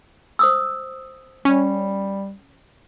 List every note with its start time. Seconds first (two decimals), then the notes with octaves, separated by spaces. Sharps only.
0.39 C5 D#6 E6
1.45 G3 C#4